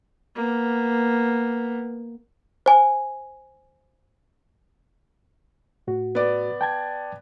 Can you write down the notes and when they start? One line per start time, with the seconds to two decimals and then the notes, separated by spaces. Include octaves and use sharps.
0.35 A#3 B3
2.66 C5 G#5
5.87 A2 F#4
6.15 B3 D5
6.61 G5 A5 G#6